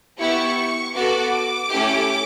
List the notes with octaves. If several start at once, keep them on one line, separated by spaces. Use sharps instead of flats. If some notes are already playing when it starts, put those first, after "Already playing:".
B3 E4 G4 C#6
B3 F#4 A4 D6
A3 C#4 E4 G4